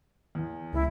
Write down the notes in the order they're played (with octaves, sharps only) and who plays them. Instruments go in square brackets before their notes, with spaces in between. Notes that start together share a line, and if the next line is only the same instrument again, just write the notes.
[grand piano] E2
[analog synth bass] C#2 [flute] E4